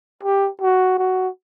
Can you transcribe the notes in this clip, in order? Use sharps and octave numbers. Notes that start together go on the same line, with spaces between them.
G4
F#4
F#4